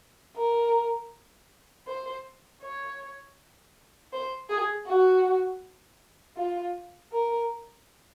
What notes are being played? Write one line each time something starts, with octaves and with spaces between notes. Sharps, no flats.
A#4
C5
C#5
C5
G#4
F#4
F4
A#4